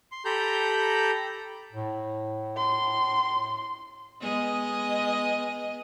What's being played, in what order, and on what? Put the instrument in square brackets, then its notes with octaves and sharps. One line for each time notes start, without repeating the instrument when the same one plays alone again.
[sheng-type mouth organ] C6
G4 A4 A#5 B5 G6
[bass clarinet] A2
[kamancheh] C6
[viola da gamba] G#3 B3 D#5